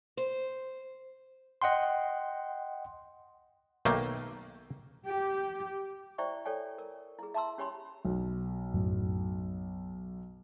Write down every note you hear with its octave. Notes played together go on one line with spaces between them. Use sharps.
C5
D#5 F#5 G5 C6
B1 D#3 A3 A#3 G5
G4
E4 C5 D5 E5 G5 C#6
A4 C#5 D5 G5 G#5
A#4
E4 G#4
E5 A5 A#5 C6 E6
C#4 G4 C#5 G#5 B5 C6
B1
F#2 A2 F#3